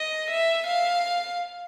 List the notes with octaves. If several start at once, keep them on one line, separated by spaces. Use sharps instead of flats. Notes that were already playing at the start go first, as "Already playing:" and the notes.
Already playing: D#5
E5
F5